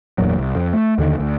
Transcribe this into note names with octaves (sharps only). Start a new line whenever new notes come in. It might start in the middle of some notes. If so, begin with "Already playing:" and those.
G1 E2 A#2 F#3
C2
F2
A3
D#2 D3 D#3
D2